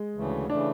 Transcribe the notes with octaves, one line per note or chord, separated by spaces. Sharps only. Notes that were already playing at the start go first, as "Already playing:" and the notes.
Already playing: G#3
D2 C#3 E3 A3
C#3 E3 A3 D4